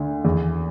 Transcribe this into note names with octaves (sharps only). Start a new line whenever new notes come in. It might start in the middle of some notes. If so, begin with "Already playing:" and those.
Already playing: D2 D3
E2